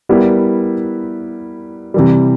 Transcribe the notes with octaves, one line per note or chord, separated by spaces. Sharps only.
G3 B3 E4 G4 A#4
C3 E3 G3